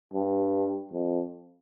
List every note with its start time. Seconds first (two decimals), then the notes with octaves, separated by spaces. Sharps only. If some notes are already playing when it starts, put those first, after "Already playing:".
0.14 G2
0.93 F2